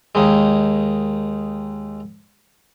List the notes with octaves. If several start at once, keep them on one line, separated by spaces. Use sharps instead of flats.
D#2 D#3 G#3